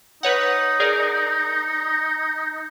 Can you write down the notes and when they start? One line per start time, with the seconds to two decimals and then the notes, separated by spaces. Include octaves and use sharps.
0.23 D#4 B4 C#5 F#5
0.80 G#4 A#4 D5